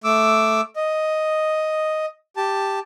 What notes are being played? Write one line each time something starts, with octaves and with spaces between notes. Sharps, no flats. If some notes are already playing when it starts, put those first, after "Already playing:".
A3 D6 E6
D#5
G4 A5